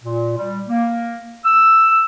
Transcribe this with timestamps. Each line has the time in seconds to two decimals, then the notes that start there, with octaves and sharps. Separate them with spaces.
0.04 A#2
0.38 G3
0.68 A#3
1.45 E6